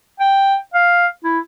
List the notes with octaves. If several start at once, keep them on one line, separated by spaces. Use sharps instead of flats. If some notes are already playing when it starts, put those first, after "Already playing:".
G5
F5
E4